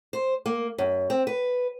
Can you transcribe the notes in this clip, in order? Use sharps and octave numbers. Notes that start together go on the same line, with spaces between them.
C5
A#3
F#2
C4
B4